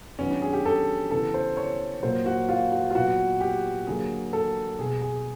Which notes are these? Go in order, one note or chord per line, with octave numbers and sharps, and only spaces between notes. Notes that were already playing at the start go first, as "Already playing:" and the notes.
D#3 F#3 B3 C#4
D4
G#4
G4
A4
C#3 E3 G3 B3 A4
C5
C#5
A#2 F#3 A#3 C5
F#4
F4
F#4
F4
A#2 F#3 B3 F#4
G4
D3 F#3 A#3 G#4
A4
B2 G3 B3 G#4
G#4